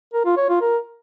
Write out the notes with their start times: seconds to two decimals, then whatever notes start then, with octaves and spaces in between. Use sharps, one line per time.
0.13 A#4
0.25 F4
0.37 C#5
0.49 F4
0.61 A#4